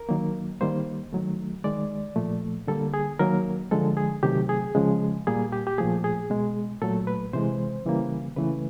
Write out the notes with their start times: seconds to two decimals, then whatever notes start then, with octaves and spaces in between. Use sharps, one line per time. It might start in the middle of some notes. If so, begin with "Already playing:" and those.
Already playing: A#4
0.09 D#3 F#3 A#3
0.61 D#3 G3 A#3 C5
1.13 D#3 F#3 A3
1.64 D#3 G#3 D5
2.16 A#2 F3 A3
2.68 D3 G3 A#3 A4
2.94 G#4
3.19 D#3 F#3 A#3 A#4
3.71 D3 F3 G#3 A4
3.97 G#4
4.23 C3 D#3 F#3 A3 G4
4.49 G#4
4.75 C#3 F3 G#3
5.27 A#2 G3 A#3 G#4
5.53 G4
5.67 G4
5.78 A#2 F3 A3 G#4
6.04 G#4
6.30 B2 G#3
6.82 A#2 F#3 A3 A4
7.07 B4
7.33 C3 E3 G#3 C5
7.86 C#3 E3 G3 A#3
8.36 C#3 E3 A3 B4